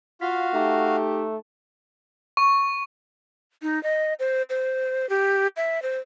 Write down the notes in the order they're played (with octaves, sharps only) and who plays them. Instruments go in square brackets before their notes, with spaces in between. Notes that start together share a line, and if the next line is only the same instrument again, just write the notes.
[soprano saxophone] F4 [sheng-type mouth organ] F#4 F5 [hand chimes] B6
[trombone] A3 [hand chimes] D#4 E5 A#5 [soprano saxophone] G4
[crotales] C#6
[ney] D#4
D#5
C5
C5
G4
E5
C5